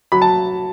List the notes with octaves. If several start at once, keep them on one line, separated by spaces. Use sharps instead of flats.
F#3 B5
A5